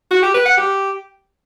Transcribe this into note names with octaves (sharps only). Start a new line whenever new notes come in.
F#4
G4
B4
F#5
G4